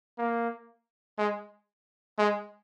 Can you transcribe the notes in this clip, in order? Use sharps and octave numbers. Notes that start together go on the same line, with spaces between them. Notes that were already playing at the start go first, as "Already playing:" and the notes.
A#3
G#3
G#3